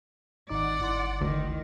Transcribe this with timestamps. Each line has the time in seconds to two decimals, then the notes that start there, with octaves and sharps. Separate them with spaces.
0.50 G#1 D#4 D5 F#5 D6
0.80 G1 E4 C6
1.21 D2 D#3